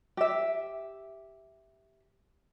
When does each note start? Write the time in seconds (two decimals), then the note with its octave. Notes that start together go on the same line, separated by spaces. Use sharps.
0.17 G4 E5